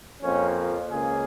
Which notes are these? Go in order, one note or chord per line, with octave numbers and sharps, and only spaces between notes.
F2 F3 A#3 C#4
F4
C#2 C#3 A#3 G#4